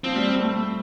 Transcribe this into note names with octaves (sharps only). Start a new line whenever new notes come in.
F3 C4
G3
G3
A3